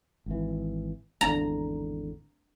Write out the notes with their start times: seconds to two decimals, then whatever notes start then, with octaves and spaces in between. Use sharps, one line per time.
0.26 G#1 E3
1.21 G#1 E2 D3 A#5